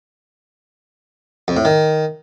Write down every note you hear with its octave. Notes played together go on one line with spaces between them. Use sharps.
F2
A2
D#3